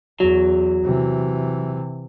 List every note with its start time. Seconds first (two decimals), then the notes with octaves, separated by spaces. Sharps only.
0.20 E2 F#3
0.84 C3 E3